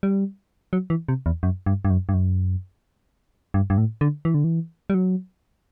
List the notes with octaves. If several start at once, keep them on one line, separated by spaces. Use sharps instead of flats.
G3
F#3
E3
C3
E2
F#2
G2
G2
F#2
G2
F#2
G2
G2
A2
D3
E3
D3
E3
G3
F#3